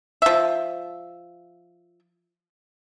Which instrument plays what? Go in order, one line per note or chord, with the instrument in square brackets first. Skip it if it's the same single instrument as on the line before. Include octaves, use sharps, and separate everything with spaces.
[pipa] F3 E5